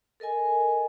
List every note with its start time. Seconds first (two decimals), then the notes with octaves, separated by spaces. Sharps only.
0.20 A4 A#4 D#5 G#5